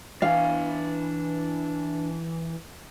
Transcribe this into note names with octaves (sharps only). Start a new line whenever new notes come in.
E3 D4 F5 G#5